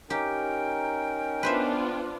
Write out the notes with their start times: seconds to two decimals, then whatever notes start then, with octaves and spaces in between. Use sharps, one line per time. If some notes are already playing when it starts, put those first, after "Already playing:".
0.10 C#4 D#4 G4 A#4 G5
1.43 B3 D4 F4 B4 C5 E5